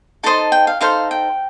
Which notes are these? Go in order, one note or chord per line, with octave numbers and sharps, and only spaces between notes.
D#4 A4 C5 D#5 A5
G5
F5
D#4 A4 C5 F5
G5